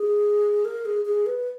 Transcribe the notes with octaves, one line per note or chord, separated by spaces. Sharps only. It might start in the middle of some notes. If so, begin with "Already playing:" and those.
Already playing: G#4
A#4
G#4
G#4
B4